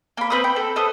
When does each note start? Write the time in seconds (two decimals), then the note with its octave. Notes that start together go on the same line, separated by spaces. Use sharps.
0.17 A#3 B5
0.30 C4 B4 D#6
0.44 B4 G5
0.56 A4
0.76 A4 B4 C5 D#6